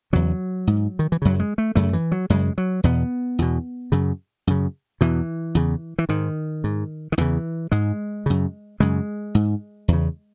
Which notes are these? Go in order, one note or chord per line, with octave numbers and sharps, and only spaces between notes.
E2 C#3 F#3
G#2
D#3
E3
F#2 C#3 F#3
G#3
A3
F#2 C#3 A3
E3
F#3
F#2 C#3 G#3
F#3
E2 B2 B3
E2 B2
F#2 C#3
F#2 C#3
E2 B2 E3
E2 C#3
E3
G#2 D#3
G#2
D#3
E2 C#3 E3
G#2 G#3
F#2 C#3
F#2 C#3 G#3
G#2
E2 C#3